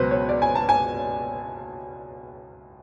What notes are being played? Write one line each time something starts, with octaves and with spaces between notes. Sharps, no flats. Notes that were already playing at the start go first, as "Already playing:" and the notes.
Already playing: C#2 B2 F#3 B4 C5
C#5
D5
G#5
A5
G#5